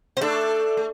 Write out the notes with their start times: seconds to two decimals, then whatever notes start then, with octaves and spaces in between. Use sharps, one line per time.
0.17 C4 C5
0.21 A3 D4 A4
0.77 A3